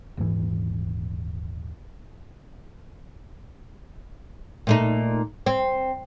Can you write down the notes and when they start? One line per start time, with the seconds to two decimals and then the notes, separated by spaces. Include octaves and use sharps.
0.17 D#1 G#2 E3
4.67 A#2 A3 D#4
5.46 C4